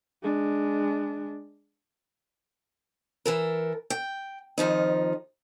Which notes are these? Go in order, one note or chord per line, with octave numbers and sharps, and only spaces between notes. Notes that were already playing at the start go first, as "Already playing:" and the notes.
G#3 D4
E3 A4 A#4
G5
F2 D#3 F3 D#4